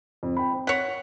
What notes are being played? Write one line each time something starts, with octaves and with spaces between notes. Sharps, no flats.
F2
G5 B5
C4
C#5 F#5 B6